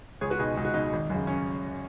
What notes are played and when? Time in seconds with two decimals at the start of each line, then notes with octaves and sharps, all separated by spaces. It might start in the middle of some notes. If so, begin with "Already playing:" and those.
0.21 C#2 G#4 C#5
0.30 F#4 B4
0.39 B2 D#4 G#4
0.57 C#2 D#4
0.65 F#4
0.74 B2 D#4
0.93 G#1
1.10 F#2 C#3
1.27 C#4